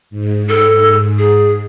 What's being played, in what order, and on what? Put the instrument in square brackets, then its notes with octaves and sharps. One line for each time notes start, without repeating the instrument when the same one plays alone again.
[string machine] G#2
[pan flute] A4
G#4